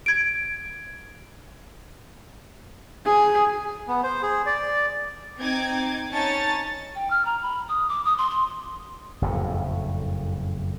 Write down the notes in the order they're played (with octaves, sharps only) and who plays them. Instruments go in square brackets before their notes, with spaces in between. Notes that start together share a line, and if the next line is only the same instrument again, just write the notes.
[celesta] G#6 D7
[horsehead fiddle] G#4
[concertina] B3
C5
G#4
D5
[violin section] C4 D#4 D6 G#6
C#4 D#4 C#5 A5 A6
[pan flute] G5
F6
A#5
B5
D#6
D6
D#6
C6
C6
[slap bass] F#1 F2 A2